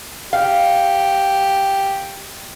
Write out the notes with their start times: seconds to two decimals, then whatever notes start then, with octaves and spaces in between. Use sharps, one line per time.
0.33 G4 F5